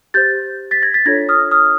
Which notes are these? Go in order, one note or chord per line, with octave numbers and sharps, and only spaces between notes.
G4 C5 G6 A6
A6 B6
G#6 A#6
A6 B6
D4 F4 A4 C#5 G#6 A#6
D#6 F6
D#6 F6